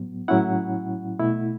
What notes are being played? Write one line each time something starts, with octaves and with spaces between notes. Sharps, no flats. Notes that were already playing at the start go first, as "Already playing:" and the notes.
Already playing: A2 F#3 B3
A2 F#3 C#4 E4 F#5
B2 A3 E4